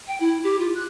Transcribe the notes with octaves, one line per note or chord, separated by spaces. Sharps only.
G5
E4
G4
F4
F#6